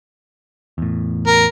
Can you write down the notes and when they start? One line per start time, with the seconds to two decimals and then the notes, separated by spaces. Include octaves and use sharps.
0.78 E2 A2
1.27 A#4